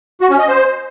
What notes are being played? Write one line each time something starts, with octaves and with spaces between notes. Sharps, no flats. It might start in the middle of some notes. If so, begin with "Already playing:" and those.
F#4
C#4
D#5
C5